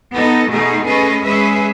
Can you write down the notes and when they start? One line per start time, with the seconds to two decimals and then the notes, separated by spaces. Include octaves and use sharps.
0.12 B3 D#4 A4 D#5
0.50 B2 A3 D#4 G#4
0.86 A3 C#4 G#4 B4 D#5
1.24 G#3 C#4 G#4 B4 E5